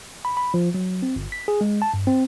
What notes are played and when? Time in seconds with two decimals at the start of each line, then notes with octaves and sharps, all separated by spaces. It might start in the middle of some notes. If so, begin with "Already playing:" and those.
0.25 B5
0.37 B5
0.54 F3
0.74 F#3
1.03 C4
1.16 G1
1.32 B6
1.48 G#4
1.61 G#3
1.82 A5
1.94 G2
2.07 C4